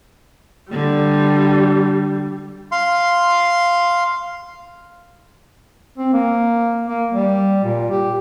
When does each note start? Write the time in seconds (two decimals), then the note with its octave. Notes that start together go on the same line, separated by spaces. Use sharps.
0.72 D3 G3
2.72 F5 C6
5.98 C4
6.13 A#3
6.87 A#3
7.14 G3
7.64 A#2
7.91 G4